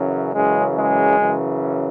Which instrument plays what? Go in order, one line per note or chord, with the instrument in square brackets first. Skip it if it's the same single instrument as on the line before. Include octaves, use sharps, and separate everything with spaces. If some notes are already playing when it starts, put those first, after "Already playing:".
Already playing: [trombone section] F#2 C#3 E3
F#2 C#3 E3 G#3
G#3
F#2 C#3 E3